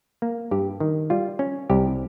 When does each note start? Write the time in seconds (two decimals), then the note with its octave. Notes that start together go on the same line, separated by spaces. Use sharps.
0.22 A#3
0.51 G2 G4
0.80 D#3
1.10 G3 F4
1.39 C#4
1.70 C2 G4